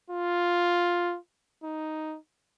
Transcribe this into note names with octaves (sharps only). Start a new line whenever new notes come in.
F4
D#4